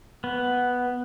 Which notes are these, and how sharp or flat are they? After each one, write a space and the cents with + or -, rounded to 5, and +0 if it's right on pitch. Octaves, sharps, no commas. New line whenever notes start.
B3 +0